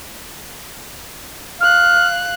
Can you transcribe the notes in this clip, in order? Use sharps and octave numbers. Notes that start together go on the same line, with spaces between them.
F5 F6 F#6